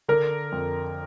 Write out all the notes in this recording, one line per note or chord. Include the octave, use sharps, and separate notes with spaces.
D3 A#4
F2